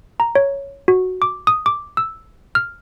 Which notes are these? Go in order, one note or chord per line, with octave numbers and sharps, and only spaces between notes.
A#5
C#5
F#4
D6
D#6
D6
E6
F6